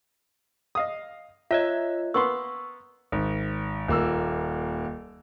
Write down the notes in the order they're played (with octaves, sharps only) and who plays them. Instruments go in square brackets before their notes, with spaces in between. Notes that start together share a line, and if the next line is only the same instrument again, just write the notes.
[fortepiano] D#5 F5 D#6
[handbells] F4 C#5 D#5 [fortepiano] E5
[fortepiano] A#3 B3 C6 [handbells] C#6 E6
[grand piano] G#1
D#1 A#3 E6